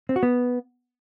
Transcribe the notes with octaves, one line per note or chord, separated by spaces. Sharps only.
C4
F#4
B3